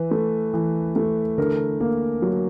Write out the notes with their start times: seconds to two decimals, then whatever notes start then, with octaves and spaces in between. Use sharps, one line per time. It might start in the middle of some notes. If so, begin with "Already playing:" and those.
Already playing: E3 B4
0.11 A3
0.54 E3
0.96 A3
1.38 D3 A#4
1.81 A#3
2.22 F#3